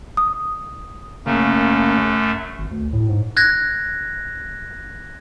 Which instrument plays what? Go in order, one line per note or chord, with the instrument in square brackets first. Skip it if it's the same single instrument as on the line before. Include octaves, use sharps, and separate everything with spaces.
[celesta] D#6
[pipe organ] F#2 A3 [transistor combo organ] C#3 A#3
[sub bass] G#1
D2
A2
G#2
[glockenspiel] F#6 G#6 A#6